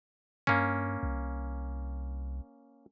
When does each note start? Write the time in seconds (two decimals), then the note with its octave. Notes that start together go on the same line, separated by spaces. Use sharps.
0.47 G2 A#3 C#4
1.03 C2